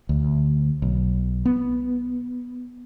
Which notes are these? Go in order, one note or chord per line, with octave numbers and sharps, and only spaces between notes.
D2
B1
B3